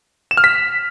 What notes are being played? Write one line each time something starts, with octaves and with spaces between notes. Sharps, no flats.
E7
F6
B6